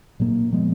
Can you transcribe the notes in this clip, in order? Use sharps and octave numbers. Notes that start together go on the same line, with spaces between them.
A#2 F#3 A#3
F3 G#3 B3